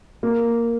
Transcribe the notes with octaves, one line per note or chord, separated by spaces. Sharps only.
A#3